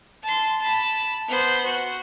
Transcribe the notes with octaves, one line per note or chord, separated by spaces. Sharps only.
A5 C6
A5 B5
B3 C5
F#4